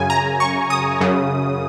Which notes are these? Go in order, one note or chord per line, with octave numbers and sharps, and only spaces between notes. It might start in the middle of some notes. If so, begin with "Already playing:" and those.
Already playing: F#2 C#3 G#5
A#5
C#6
D#6
F#2 C#3